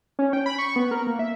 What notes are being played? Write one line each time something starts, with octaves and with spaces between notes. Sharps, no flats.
C#4
G5
B5
C#6
B3
A#4
A#3
E5